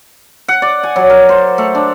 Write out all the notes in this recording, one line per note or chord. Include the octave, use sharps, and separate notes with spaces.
F#5
D5
G#5
F#3
A#4
C5
A3
D4